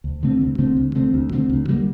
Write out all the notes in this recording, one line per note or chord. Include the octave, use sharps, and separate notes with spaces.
D2
D3 A3 C4
D2
D3 A3 C4
D2
D3 A3 C4
D2
D3 A3 C4
D2
D3 G3 A#3